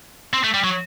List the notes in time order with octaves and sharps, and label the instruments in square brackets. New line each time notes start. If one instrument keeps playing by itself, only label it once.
[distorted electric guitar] C4
A3
G3
F#3